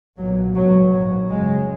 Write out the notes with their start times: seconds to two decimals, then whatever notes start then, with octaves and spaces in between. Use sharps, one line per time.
0.18 B1 A#2 F#3
0.56 C#2 B2 F#3
0.93 A#1 G#2 F#3
1.29 F#1 F#2 C#3 G#3